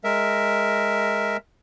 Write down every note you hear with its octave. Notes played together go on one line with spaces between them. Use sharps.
G#3 A#4 E5